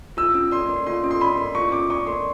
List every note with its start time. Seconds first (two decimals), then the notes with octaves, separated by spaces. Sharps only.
0.17 F4 E6
0.35 C#4
0.52 D5 C6
0.69 A#4
0.87 F4 C6
1.04 C#4
1.11 C6
1.21 D5 B5
1.38 A#4
1.55 F4 C#6
1.72 C#4 D6
1.90 D5 C#6
2.07 A#4 C6